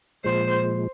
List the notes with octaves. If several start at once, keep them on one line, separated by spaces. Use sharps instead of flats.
A#2 F3 G#3 C5